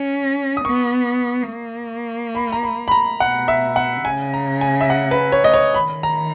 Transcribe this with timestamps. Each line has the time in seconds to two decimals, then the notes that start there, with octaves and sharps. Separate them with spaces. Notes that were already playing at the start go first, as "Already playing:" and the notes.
Already playing: C#4
0.57 D#6
0.65 B3 C#6
1.49 A#3
2.35 B5
2.52 A#5
2.63 B5
2.88 B5
2.91 A#5
3.20 B2 F#5
3.48 E5
3.76 F#5
4.04 C#3 G#5
4.34 A#5
4.61 G#5
4.81 E5
4.90 F#5
5.11 B4
5.32 C#5
5.44 D#5
5.54 C#5
5.74 D#3 B5
6.03 A#5